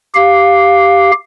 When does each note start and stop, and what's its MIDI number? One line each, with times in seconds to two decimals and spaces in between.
0.15 1.11 67
0.15 1.11 77